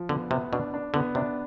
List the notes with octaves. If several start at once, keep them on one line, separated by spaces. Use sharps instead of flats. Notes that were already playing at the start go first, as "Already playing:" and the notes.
Already playing: F3
D3 B3
C3 B3
B2 D4
D4
D3 B3
C3 D4